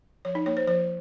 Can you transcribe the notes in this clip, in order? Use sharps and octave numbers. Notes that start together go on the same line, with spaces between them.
F3 C#5
D#4
A#3 C#5
C5
F3 C5